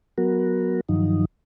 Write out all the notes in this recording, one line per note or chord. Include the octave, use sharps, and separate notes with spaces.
F#3 B3 F#4 A#4
G2 D#3 F3 F#3 D#4